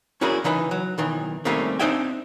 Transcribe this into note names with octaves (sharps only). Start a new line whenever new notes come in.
C#4 E4 F#4 G#4 A#4 D5
C#3 E3 D#4 B4
F#3
B1 D#3 E3
C3 D#3 G3 A3 A#3 C#4
C4 D4 D#4 E5 G5 G#5